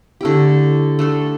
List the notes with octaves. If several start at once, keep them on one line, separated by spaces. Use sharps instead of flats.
D3 A3 E4 G4
A3 D4 A4